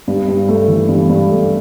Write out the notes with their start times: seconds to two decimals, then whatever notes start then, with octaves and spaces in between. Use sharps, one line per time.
0.08 G2
0.28 G2
0.49 A3
0.68 E3
0.88 G2
1.09 G2
1.30 A3